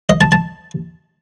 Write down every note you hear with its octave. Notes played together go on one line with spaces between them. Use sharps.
D#5
A5
A5